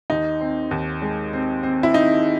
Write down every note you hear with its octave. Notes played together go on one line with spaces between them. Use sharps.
D#2 D#4
C4
D#2
G#3
C4
C4
E4
C4 D#4